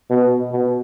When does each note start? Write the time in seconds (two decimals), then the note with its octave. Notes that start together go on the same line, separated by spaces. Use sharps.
0.11 B2
0.52 B2